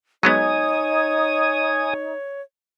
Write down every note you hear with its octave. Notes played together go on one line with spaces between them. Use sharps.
F#3 G#3 B3 D#4 C#5 G#5 D#6